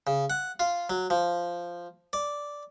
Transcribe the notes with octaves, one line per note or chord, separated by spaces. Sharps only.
C#3
F#5
F4
F#3
F3
D5